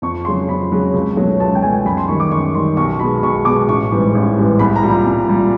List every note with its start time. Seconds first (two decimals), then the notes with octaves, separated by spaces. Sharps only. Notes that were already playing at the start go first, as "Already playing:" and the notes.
0.02 F2 C#6
0.25 C#3 F#3 C6
0.49 F2 B5
0.72 C#3 F#3
0.94 C#2
1.16 B2 F#3 A3
1.40 C#2 A5
1.55 G5
1.62 B2 F#3 A3 G#5
1.85 F#2 B5
1.97 C6
2.08 D#3 C#6
2.11 G3
2.20 D6
2.31 F#2 C#6
2.54 D#3 G3 C6
2.77 B1 C#6
2.99 B2 G#3 B5
3.23 B1 C#6
3.45 B2 D6
3.48 G#3
3.68 A1 C#6
3.91 G#2 E3 G3
4.14 A1
4.38 G#2 E3 G3
4.59 C2 B5
4.76 A#5
4.83 A#2 G3
4.91 A#5
5.05 C2
5.28 A#2 G3